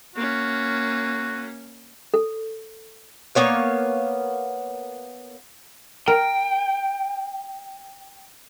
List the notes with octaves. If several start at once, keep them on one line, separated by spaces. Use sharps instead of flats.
A#3 C#4 F#4
A4
A#3 B3 C#5 F5
A#4 G5